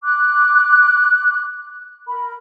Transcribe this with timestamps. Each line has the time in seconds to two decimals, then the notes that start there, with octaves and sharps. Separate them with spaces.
0.03 D6 F#6
2.07 A#4 B5